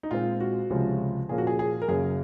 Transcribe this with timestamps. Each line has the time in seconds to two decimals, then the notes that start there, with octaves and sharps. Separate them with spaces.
0.03 D#4
0.11 A#2 G#3 C4 F4
0.40 F#4
0.70 C#2 C3 F3 G#3 C#4
1.29 A#2 F3 A#3 C#4 G#4
1.38 F#4
1.47 G#4
1.59 G#4
1.82 A#4
1.88 F#2 C#3 F#3 A#3 C#4 G#4